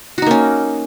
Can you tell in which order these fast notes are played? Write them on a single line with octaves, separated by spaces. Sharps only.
F#4 D#4 A#3 C#4